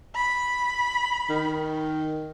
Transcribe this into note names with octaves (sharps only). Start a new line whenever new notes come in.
B5
D#3